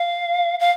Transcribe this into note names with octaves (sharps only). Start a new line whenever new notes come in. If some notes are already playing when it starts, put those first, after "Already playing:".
Already playing: F5
F5